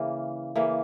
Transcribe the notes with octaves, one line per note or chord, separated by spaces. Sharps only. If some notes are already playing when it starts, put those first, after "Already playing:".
Already playing: C#3 E3 A#3
C#3 E3 A#3